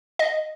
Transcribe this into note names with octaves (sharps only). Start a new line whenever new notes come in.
D#5